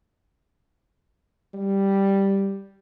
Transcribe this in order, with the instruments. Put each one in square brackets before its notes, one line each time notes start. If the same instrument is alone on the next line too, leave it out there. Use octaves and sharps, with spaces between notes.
[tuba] G3